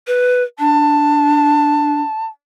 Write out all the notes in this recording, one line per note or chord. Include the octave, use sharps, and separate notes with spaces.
B4
D4 A5